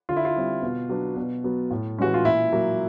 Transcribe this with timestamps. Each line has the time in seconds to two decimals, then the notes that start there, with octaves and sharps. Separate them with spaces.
0.09 D3 F4
0.17 E4
0.25 F4
0.36 G3 C4
0.63 B2
0.89 F#3 B3 D4
1.16 B2
1.44 F#3 B3
1.71 A2
1.98 E3 G#3 C#4 F#4
2.14 F4
2.24 A#2 E4
2.52 F#3 A#3